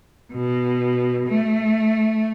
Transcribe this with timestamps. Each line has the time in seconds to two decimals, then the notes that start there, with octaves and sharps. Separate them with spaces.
0.32 B2
1.27 A3